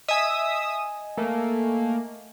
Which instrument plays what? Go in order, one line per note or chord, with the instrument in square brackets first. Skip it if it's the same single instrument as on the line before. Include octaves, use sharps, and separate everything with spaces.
[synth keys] D#5 G#5 [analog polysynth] E5 D#6 E6
[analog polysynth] A3 [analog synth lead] A#3